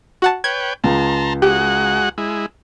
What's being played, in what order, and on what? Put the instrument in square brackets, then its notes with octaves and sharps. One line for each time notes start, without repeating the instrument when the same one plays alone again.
[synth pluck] F#4 F#5 A5
[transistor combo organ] B4 C#5 G5 [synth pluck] G#6
[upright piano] C#2 [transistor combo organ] A5 A#5 C6
[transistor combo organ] G#3 F#4 F#5 [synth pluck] G4
[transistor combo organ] G#3 E4